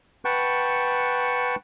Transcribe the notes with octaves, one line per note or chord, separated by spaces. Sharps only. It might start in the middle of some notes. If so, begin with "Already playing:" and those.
B4 F#5 G5 A5 C#6